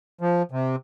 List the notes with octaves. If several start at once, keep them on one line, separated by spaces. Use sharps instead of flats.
F3
C3